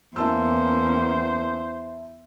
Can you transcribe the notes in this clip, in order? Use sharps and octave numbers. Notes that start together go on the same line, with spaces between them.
E2 A#3 C#4 E4 C5 A5 E6